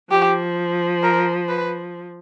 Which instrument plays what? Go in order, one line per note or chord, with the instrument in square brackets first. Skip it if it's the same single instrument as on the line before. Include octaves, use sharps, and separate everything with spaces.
[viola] F3 [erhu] G4
[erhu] A#4
B4